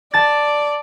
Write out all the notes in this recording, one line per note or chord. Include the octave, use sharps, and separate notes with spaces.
D5 A5 A6